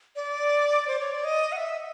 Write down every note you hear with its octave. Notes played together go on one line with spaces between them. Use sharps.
D5
C5
C#5
D5
D#5
F#5
E5